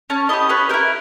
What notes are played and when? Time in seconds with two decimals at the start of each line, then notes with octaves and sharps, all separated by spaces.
0.10 C#4 A5
0.29 E4 G4 D#5
0.49 C#4 B4
0.69 E4 G4 A#4